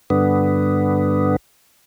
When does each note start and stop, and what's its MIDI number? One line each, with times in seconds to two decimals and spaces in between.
0.10 1.36 43
0.10 1.36 50
0.10 1.36 59